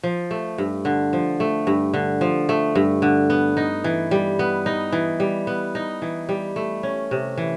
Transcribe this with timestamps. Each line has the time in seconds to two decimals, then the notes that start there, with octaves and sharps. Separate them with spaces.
0.03 F3
0.31 A3
0.58 G2
0.85 D3
1.13 F3
1.40 A3
1.67 G2
1.94 D3
2.21 F3
2.49 A3
2.75 G2
3.02 D3
3.30 B3
3.57 D#4
3.84 E3
4.11 G3
4.39 B3
4.66 D#4
4.92 E3
5.20 G3
5.47 B3
5.75 D#4
6.02 E3
6.29 G3
6.56 A3
6.83 C#4
7.11 C3
7.38 E3